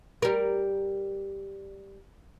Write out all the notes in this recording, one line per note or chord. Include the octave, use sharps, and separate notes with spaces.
G3 A#4